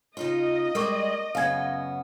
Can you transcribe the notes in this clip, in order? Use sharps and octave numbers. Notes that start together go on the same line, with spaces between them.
C#3 D#4 F4 D#5
G3 G#3 A#4 D5 C#6 D6
F#2 C#3 B3 F5 G#5 G#6